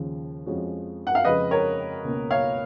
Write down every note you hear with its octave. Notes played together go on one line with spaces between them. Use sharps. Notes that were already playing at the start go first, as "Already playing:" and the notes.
Already playing: D#2 C#3 F3
F2 F3 G#3 C#4 F#4
F#5
F5
F2 C#3 G#3 B4 D#5
A#4 C#5
C#2 B2 A#3 C#4
C#5 F5